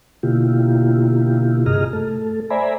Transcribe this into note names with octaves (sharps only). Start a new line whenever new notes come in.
B2 D3 A#3 E4 F4 G4
G2 C3 G#4 D#5 A#5 F6
A3 A4
C5 D5 E5 G#5 A#5 B5